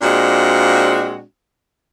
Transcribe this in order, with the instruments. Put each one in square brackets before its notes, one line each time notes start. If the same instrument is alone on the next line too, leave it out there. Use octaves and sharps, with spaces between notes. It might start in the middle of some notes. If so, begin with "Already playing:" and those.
[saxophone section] A#2 G#3 C4 D4 F#4